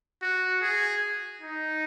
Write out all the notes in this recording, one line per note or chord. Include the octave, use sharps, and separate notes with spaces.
F#4
G#4
D#4